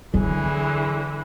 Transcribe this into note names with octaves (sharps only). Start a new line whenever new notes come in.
D3 E3 F#3 E4 G#4